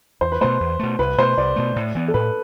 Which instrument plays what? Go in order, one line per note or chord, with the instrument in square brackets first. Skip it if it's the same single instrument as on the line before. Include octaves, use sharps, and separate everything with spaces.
[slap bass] E2 [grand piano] C5
[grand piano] B4
[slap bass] B2 A3 [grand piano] C5
[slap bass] E2
B2 A3
[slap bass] C2 [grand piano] B4
[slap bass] B2 A3 [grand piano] C5
[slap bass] C2 [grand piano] D5
[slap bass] B2 A3
A2
E3 B3
[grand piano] A4
[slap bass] A2 [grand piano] B4